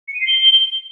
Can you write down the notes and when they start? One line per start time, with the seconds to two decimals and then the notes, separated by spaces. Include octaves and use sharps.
0.08 C#7
0.14 D#7
0.21 C7
0.27 G7